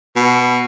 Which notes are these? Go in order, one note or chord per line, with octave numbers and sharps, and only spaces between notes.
B2